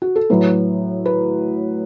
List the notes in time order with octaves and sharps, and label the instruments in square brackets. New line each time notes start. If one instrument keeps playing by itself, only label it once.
[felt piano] F#4
A4
A2 F#3 B4
B4